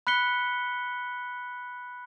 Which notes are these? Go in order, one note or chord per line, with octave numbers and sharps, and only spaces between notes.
B5 F#6 B6 C#7 G7